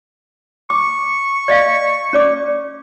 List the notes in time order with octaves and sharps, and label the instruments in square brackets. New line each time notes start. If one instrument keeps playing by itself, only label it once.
[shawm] C#6 [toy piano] D6
[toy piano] D5 D#5 F5
C#4 D5 D6